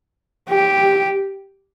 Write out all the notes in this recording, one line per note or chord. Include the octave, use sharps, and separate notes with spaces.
G4